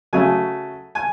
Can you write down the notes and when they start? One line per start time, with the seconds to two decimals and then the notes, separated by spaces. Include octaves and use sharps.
0.13 C#3 F#3 A3 G#5
0.95 G#5